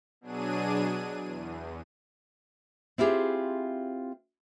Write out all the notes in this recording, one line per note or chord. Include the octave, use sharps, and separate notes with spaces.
B2 F#3 D4 G#4 D#7
E2
C4 E4 F4 G4 G#4